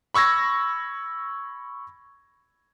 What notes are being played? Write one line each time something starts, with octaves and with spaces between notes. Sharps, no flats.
B5 C#6 E6 G#6 A#6